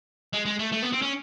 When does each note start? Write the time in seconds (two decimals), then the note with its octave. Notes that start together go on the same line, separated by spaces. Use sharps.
0.33 G#3
0.45 G#3
0.59 A3
0.72 A3
0.82 B3
0.92 C4
1.02 C#4